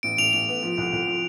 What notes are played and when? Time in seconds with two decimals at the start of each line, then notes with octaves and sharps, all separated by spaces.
0.03 A1 D7
0.18 A1 F7
0.33 A1 F7
0.48 B3
0.63 F3
0.78 C2
0.92 C2
1.07 F3